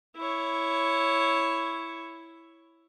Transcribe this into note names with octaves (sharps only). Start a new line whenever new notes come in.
E4 C#5